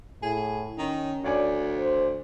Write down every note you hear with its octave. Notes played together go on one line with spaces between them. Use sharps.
A2 G#4
D#3 C#4
D2 C#5 D5 G#5
C5